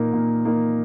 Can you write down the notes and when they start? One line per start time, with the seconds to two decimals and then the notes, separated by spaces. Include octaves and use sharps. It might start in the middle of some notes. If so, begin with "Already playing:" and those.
Already playing: A#2 A#3 D#4
0.13 A#2
0.45 A#3 D#4